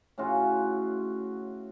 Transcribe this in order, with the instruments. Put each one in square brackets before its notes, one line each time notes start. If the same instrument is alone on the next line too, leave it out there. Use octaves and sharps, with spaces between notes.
[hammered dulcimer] A2 C#3 F4 F#4